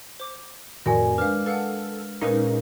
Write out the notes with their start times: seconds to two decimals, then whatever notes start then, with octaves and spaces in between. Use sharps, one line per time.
0.20 C5 D6
0.86 F2 A2 D#3 F#4 A#4 D5 G#5
1.18 G#3 D4 B4 C5 F5 F6
1.46 A4 B4 F5 F#5
2.21 A#2 G#3 C#4 D#4 A#4 B4 F5